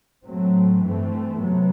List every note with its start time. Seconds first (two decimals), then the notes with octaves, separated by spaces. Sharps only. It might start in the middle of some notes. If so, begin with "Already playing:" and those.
0.25 A2 F#3 A3 C4
0.83 G2 E3 A3 C4
1.40 C3 F#3 B3